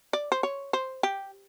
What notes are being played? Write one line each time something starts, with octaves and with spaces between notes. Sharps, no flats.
D5
C5
C#5
C5
G4